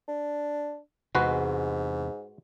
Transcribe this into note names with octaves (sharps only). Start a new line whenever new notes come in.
D4
E2 G#2 C3 G#3 F#4 B4